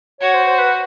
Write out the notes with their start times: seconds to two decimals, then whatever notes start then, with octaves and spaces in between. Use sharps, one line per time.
0.21 F#4 C#5
0.34 C5
0.47 C5
0.60 B4